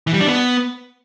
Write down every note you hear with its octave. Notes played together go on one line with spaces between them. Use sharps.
E3
G3
D4
B3